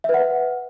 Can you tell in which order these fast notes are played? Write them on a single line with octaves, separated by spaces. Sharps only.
E5 B4 F#5